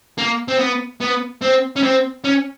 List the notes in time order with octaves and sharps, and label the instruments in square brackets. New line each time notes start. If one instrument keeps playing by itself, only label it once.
[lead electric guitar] A#3
C4
B3
B3
C4
C#4
C4
C#4